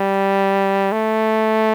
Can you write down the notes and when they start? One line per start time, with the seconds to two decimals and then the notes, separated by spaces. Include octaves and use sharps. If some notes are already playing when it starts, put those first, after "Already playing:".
Already playing: G3
0.92 A3